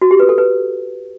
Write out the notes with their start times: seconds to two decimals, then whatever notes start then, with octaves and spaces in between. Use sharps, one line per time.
0.02 F#4
0.11 G4
0.20 B4
0.29 A4
0.38 B4